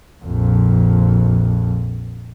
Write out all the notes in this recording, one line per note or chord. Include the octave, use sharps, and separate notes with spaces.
A#1 F2